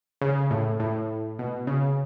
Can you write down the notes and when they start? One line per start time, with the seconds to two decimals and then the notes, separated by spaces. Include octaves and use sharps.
0.21 C#3
0.51 A2
0.80 A2
1.39 B2
1.67 C#3